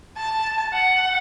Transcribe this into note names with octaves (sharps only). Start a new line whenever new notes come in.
A5
F#5